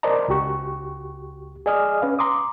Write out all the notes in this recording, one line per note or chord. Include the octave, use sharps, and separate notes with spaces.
A#4 C5 D5 D#5 A5 A#5
C#2 F#4 G4 C#6
G#4 D5 D#5 G#5 D#6 F6
C#4 B4 F5
A#5 C6 D6 D#6